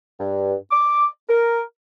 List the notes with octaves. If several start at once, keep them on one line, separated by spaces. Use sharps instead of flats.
G2
D6
A#4